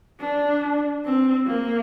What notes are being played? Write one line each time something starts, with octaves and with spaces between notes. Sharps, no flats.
D4
C4
A#3